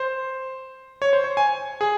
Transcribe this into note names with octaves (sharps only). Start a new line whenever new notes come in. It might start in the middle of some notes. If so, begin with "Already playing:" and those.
Already playing: C5
C#5
C5
C#5
G#5
G#4